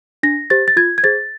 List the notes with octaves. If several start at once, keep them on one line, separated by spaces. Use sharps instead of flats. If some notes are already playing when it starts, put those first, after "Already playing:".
D4 A#6
G4 C5 A6
A6
F4 G#6
G#6
G#4 C5 A6